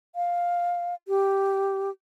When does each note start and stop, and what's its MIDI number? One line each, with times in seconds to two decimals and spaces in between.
0.16 0.95 77
1.08 1.90 67